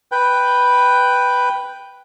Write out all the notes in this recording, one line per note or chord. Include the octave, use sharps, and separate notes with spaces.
B4 G5